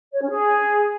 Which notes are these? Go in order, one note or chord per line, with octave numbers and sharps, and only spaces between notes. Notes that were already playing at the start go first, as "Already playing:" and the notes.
C#5
C#4
G#4